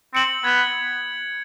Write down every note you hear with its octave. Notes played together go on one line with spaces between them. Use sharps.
C4 C#7 F#7
B3 G#6